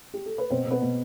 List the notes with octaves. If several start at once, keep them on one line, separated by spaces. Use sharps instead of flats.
G4
A4
B4
B2 C4 C5
B2
B3 B4
B2